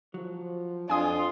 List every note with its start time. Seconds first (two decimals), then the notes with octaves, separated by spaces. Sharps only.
0.14 F3 F#3
0.90 F2 D4 F4 G#5 D#6